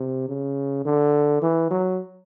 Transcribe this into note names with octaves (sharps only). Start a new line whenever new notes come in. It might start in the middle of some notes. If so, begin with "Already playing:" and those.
Already playing: C3
C#3
D3
E3
F#3